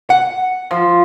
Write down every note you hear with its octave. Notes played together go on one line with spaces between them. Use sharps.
F#5
F3